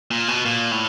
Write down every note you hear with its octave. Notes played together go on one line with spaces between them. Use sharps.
A#2
B2
A#2
A2